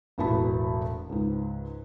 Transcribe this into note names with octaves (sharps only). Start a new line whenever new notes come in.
E1 A1 B3 F#4 A5 B5
C#2 G#2